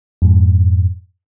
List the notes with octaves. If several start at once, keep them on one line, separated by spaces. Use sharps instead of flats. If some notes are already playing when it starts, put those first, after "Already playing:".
F2 G#2